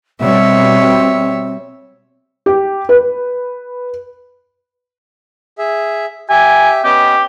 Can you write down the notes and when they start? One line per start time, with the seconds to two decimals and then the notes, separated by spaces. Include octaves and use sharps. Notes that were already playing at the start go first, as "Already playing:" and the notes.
0.21 B2 G3 C4 C#5 E5
2.46 G4
2.89 B4
5.58 G#4 E5
6.30 G4 E5 G#5
6.84 B3 C#4 G4 D#5